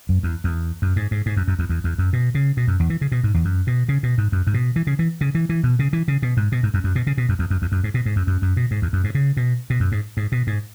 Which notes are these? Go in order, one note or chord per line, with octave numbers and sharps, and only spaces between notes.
F#2
E2
E2
F#2
G#2
G#2
G#2
F#2
F#2
E2
E2
E2
F#2
B2
C#3
B2
F#2
E2
E3
C#3
B2
G#2
E2
F#2
B2
C#3
B2
G#2
F#2
G#2
B2
E3
C#3
E3
C#3
E3
E3
B2
C#3
E3
C#3
B2
G#2
B2
G#2
F#2
F#2
B2
C#3
B2
F#2
E2
F#2
E2
F#2
G#2
B2
G#2
F#2
F#2
F#2
B2
G#2
E2
F#2
G#2
C#3
B2
B2
F#2
G#2
G#2
B2
G#2